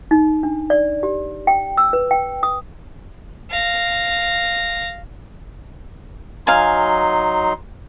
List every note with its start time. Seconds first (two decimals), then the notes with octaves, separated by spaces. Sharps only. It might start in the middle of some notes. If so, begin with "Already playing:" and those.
0.11 D#4
0.43 D4
0.70 D5
1.03 G4
1.47 G5
1.77 E6
1.93 B4
2.11 G5
2.43 D#6
3.50 F5 A#6
6.47 F#3 D#4 F5 G#5 C6